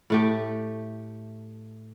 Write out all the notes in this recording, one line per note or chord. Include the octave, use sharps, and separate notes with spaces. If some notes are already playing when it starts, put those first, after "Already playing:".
A2 A3 G4